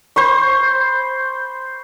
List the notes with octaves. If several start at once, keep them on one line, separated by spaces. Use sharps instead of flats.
C5 B5 C#6